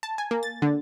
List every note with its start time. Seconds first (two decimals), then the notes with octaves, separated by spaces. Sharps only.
0.03 A5
0.18 G#5
0.31 A#3
0.43 A6
0.62 D3